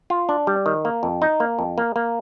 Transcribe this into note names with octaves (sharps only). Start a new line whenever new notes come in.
F4
D4
G3
D#3
A#3
F2
D#4
A#3
F2
A#3
A#3